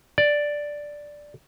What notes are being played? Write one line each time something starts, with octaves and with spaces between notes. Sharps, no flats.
D5